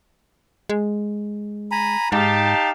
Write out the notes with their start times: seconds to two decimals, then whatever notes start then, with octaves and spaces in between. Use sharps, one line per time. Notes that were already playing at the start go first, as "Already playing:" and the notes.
0.69 G#3
1.71 G#5 A#5 B5
2.12 G#2 D#4 G4 F5 A5